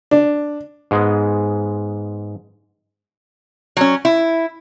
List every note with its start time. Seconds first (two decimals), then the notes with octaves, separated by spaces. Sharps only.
0.11 D4
0.91 G#2 G#3 B3
3.77 F#3 C#4
4.05 E4